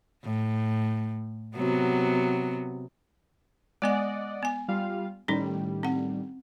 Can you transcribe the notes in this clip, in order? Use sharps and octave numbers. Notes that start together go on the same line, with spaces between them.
A2
C3 F#3 B3
G#3 B3 D5 D#5 F#5 G#5
B3 G#5
G3 F4 F5
A2 D#3 G3 C#4 D#4
C4 F#5